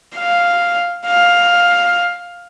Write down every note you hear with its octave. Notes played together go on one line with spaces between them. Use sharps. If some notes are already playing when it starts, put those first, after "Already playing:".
F5
F5